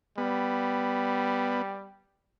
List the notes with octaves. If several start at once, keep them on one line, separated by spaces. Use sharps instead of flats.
G3 B3